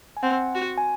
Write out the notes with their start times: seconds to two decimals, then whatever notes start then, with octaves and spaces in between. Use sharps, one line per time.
0.17 G#5
0.23 C4 F#5
0.55 F#4
0.78 G#5